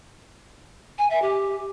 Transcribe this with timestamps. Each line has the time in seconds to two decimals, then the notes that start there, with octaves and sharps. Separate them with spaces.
0.98 G#5
1.10 E5
1.22 G4